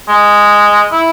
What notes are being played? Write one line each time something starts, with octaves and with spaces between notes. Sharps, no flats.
G#3
E4